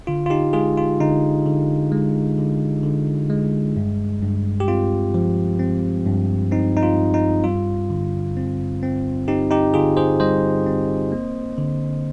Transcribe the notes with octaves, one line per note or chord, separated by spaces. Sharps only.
D3 F4
F4
D#4 G4
G#3 F4 G#4
F4
D3 D#4
D3
G#3
D3
D3
G#3
G2
G2
G4
C4 F4
F3
C4
G2
C4 D#4
D#4
F4
G2
D#4
G3 F4
D3
C4
C4
C4 D#4 G4
D#4 G4
D3 F4 G#4
G#4 C5
G3 C5 D#5
C4
A#3
D3